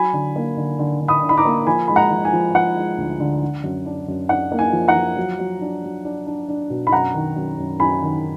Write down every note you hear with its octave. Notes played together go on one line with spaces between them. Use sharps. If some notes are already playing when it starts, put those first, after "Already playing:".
Already playing: F#3 G#5 B5
D3
A#3
D3
D3
D3
B5 D#6
D3
B5
A#5 D6
A#3
F3 G#5 B5
G#3 B5
F#5 A#5
F3
G#5
F3
F3 F#5
G#3
D2
D3
D4
F#2
D4
F#2
D4 F#5
A#3
G#5
F3
F#5 A#5
F3
F#3
F#3
D4
F#3
D4
D4
D4
B2
B5
F#2 F#5 A#5
D#3
F#2
F#2
F#2 G#5 B5
D#3